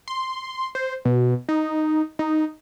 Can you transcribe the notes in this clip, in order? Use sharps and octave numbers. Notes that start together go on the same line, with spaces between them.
C6
C5
B2
D#4
D#4